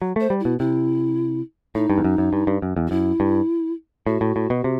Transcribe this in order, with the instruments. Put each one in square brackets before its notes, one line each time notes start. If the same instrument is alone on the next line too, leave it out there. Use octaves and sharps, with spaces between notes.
[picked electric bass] F#3
[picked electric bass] A3 [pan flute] C5
[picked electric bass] G3
[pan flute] E4
[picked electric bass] B2
[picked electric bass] C3 [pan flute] E4
[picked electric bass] A2 [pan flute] D#4
[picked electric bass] G2
E2
F#2
F#2
G2
G2
F#2
E2
[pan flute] F#4
[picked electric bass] F#2 [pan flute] E4
[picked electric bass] G2
[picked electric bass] A2 [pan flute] F#4
[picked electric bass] A2
A2
B2
C3